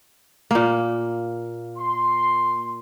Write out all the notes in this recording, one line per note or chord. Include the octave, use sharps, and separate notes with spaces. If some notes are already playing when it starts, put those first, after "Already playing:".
A#2 A#3
C6